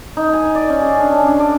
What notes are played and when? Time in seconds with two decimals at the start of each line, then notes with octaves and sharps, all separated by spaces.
0.17 D#4
0.33 G#5
0.55 D5
0.70 C#4
0.82 G#4
0.99 D4
1.12 C#4
1.26 D4
1.39 D5